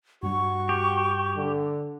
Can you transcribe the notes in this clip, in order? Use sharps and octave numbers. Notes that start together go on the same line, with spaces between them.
G2 G3 F#4 C#6
G4
D3